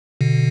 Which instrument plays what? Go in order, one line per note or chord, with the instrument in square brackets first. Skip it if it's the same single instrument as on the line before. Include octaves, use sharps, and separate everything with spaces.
[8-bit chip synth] B2 D3